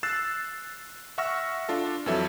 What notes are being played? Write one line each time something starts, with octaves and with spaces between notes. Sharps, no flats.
E6 F#6 A6 C7 E7
E5 F#5 C#6 E6 F6 A#6
D4 F4 A4
F2 E3 F#3 A4 E5